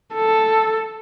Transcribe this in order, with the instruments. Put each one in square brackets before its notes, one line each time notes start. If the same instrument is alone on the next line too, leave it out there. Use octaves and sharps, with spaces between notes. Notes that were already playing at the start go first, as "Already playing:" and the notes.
[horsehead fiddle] A4